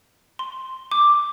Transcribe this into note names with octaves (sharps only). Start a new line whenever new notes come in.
C6
D6